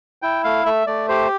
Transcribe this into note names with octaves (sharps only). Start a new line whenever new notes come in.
E4 G5
A3 F5
A3 E5
A3 D5
G4 C5